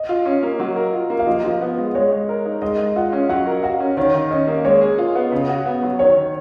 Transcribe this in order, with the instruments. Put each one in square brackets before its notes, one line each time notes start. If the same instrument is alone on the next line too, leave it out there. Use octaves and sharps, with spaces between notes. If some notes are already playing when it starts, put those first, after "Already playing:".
Already playing: [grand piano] D#5
[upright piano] F4
C#4
A#3
F#3
A#4
F4
A#3
[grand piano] F5
[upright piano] F3 [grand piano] D#5
[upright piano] F3
B3
G#3
[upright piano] G#3 [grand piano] C#5
[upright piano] G#3
A#4
D#4
[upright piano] G#3 [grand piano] D#5
[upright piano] G#3
[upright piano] F4 [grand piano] F#5
[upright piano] C#4
[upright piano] F#3 [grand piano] F#5
[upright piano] A#4
[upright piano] F#4 [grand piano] F5
[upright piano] C#4
[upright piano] D#3 [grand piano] C#5
[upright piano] D#3
[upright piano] C#4 [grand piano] D#5
[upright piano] A#3
[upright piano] G#3 [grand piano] C#5
[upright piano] G#4
F4
B3
C#3
F#4
B3
F#3
[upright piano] D#3 [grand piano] C#5
[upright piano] D#3